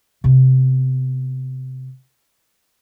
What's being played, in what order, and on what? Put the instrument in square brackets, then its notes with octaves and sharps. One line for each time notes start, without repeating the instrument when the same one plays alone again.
[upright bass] C3 B3